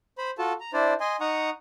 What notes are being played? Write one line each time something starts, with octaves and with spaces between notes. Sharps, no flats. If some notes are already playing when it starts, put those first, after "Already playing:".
C5 B5
F4 F#4 A4 A5
A#5
D4 E4 C5 D5
D#5 G#5 C6
D#4 F#5 A#5 C#6 D#6